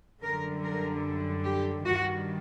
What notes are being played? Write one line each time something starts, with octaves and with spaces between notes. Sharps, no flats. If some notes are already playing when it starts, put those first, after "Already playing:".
F#2 D3 G3 A#4
A#4
G4
G2 D#3 G3 F#4